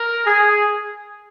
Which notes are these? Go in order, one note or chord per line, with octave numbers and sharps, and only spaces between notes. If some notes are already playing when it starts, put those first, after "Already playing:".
Already playing: A#4
G#4